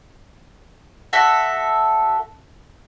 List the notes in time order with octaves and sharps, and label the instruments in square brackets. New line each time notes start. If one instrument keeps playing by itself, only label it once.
[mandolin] F#4 A4 E5